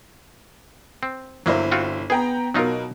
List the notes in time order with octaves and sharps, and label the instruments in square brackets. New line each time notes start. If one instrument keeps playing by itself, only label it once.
[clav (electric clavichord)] C4
[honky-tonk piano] G1 E4 C5 [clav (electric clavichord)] F#3 A#3
[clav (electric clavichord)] C4 F4 F#4
[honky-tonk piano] B3 G5 A#5 [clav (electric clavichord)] G#4
[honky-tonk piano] B2 A#4 [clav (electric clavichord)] F#3 D#4 F4